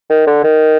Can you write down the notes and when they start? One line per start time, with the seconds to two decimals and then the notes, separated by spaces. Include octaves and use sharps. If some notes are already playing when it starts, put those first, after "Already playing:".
0.10 D#3
0.27 D3
0.44 D#3